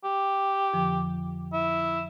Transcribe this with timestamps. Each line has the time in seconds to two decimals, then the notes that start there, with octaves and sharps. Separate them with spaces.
0.04 G4
0.73 F2 D3 F3
1.53 E4